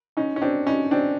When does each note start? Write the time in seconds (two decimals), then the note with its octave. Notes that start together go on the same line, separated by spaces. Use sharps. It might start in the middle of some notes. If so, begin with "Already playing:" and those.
0.17 C#4 D#4
0.36 C#4
0.42 C4 D4
0.67 C#4 D#4
0.91 C4 D4